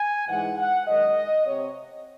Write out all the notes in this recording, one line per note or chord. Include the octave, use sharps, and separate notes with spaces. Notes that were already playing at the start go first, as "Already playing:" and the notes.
Already playing: G#5
G#2 E3 G#3 F#5
F#5
F#2 D#3 G#3 D#5
C3 C#5